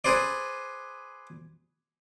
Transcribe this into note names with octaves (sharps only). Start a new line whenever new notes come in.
G#4 B4 C5 D5